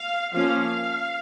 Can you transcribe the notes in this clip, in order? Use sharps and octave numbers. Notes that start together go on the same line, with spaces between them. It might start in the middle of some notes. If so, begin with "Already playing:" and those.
Already playing: F5
F3 A#3 C#4 F5
F5